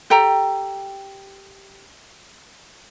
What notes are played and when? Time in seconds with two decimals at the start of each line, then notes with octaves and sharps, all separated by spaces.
0.10 G4 A4 G5 A#5